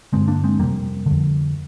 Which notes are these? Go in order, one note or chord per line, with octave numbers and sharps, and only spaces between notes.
G2 D3 G#3 C4
A#3 D4
G#3 C4
F2 C3 G3 A#3
F2 D3